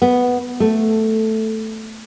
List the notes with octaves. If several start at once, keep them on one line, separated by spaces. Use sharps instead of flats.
B3
A3